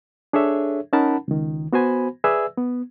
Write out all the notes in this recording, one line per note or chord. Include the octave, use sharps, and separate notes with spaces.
D4 G#4 A4 C#5 E5
C#4 D#4 A#4 F#5 A5 B5
C#2 D#3
B3 F#4 C5 G#5 B5
G#4 B4 D5 E5 G#5 E6
B3